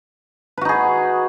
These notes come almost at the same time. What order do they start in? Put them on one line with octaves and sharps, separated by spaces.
B4 F#4 D#4 G#4